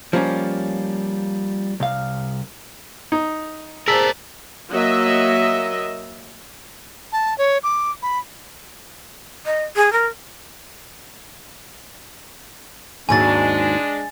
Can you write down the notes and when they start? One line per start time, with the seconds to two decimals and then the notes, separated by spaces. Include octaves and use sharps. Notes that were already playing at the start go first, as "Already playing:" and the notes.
0.13 F3 G3 A#3 C#4
1.80 C2 F5
3.12 D#4
3.88 G#4 A#4 C5 D5 A5 E6 B6
4.72 F#3 A#3 D#5 E5
7.13 A5
7.38 C#5
7.63 D6
8.02 B5
9.46 D#5
9.76 G#4
9.93 A#4
13.09 D#2 G#2 F#3 G#3 D4 G#5 A6